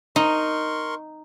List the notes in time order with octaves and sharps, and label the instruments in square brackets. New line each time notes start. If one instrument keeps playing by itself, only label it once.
[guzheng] D#4 [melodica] A#4 C6 C#6